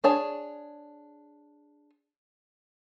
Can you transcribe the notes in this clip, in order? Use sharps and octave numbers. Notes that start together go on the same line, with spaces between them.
D4 G#4 C#5 A5